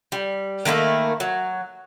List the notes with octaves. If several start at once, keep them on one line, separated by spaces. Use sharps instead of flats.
G3
D#3 A3 A#3 E4
F#3